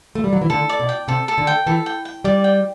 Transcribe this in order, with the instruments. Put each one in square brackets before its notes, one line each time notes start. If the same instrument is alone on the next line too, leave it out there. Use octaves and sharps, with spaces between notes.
[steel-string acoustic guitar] A3
G3
F#3
E3
[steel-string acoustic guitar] D3 [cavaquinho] A4
[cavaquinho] D5
[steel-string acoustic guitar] B2
[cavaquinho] G5
[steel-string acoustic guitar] C3 [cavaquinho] A4
[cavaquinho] A4
[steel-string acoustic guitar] D3
[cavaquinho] G5
[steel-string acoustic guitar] E3 [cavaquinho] A4
[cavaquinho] G5
G5
[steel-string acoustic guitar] G3 [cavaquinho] D5
[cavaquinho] G5